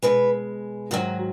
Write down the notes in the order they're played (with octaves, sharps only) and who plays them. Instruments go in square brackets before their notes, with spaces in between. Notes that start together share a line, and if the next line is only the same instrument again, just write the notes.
[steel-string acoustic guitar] B2 G#3 B4
G#2 D#3 F#3 F#4